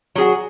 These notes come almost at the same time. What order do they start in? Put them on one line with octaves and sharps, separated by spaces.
F#3 G#4 F#4